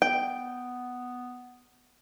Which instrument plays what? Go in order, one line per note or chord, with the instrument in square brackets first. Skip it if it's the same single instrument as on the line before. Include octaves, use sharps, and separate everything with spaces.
[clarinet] B3 [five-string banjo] G5